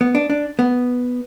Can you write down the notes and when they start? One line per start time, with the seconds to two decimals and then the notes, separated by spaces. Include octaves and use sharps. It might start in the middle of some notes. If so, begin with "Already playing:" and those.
0.01 B3
0.15 D4
0.30 D4
0.59 B3